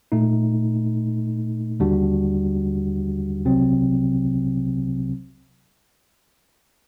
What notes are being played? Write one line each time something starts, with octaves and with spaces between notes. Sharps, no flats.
A#2 A3 D#4
D#2 D3 G3 D4 F#4
C2 C3 F#3 C4